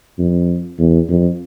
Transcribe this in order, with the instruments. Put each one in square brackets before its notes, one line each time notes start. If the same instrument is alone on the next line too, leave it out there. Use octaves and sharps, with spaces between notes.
[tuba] F2
E2
F2